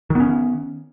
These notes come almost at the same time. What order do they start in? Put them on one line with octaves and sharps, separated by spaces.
D#3 B3 C#4